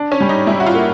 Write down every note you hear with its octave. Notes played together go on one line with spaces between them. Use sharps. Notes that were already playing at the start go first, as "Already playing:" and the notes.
Already playing: D4
C#4
G3
D#4
G3 E4
F#4
F4
A#3